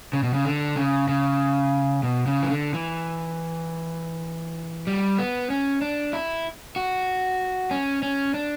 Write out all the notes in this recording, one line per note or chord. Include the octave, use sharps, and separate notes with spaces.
C#3
B2
C#3
D3
C#3
C#3
B2
C#3
E3
D3
E3
G3
B3
C#4
D4
E4
F#4
C#4
C#4
D4